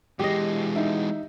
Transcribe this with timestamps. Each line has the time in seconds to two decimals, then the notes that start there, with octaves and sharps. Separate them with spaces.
0.19 E3 G#3 G4 D#5
0.76 D#4 E5